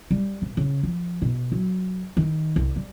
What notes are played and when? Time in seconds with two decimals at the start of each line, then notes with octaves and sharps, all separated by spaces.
0.11 G3
0.42 C3
0.57 C#3
0.83 F3
1.22 B2
1.52 F#3
2.17 D#3
2.56 C2
2.76 G3